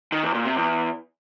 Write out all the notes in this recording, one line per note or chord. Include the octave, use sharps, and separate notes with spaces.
D#3
E2
A#2
C3
E2